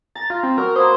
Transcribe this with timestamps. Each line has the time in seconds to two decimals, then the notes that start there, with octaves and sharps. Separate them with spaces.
0.15 A#5 A6
0.30 F4
0.43 C4
0.58 F#3 A#4
0.76 A#3 C5 B5 D#6